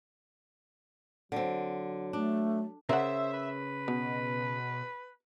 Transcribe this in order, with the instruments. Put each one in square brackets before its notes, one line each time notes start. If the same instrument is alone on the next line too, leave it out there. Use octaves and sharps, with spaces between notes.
[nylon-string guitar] D3 C4 [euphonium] F#3
[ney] A3 [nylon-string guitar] D4
[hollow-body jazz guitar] C#3 [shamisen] A#4 F#5 [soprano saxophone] C5 [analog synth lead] E5
[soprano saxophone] B4
[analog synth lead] B2 [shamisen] B3